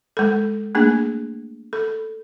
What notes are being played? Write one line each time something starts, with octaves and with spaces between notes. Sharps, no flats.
G#3 A4
A3 A#3 D4 G#4
A4